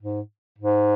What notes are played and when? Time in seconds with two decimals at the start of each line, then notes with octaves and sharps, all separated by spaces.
0.01 G#2
0.58 G#2